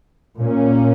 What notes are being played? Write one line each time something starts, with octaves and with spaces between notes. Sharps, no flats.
A#2 A#3 C#4